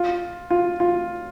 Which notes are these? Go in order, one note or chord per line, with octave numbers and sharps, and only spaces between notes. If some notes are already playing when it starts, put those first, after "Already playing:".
Already playing: F4
F4
F4